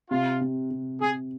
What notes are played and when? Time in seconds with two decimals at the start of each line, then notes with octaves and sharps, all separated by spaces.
0.11 C3 F4
0.41 C3
0.71 C3
1.01 C3 G#4